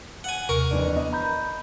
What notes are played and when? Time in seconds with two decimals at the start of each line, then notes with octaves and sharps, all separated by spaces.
0.24 F#5 G#5
0.49 D#2 C3 A#4 C#6
0.71 F2 E3 D4
0.96 B3 D#5
1.13 A#5 B5 G6